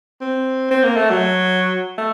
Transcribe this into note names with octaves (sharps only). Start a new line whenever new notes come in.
C4
C4
A#3
A3
F#3
A3